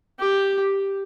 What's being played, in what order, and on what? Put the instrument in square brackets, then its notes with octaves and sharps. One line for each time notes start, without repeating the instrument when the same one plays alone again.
[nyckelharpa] G4